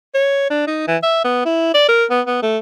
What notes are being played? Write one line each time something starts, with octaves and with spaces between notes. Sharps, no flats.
C#5
D4
D#4
E3
E5
B3
E4
D5
A#4
B3
B3
A3